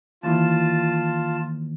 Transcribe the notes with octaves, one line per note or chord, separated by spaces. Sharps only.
D#2 E3 F4 A5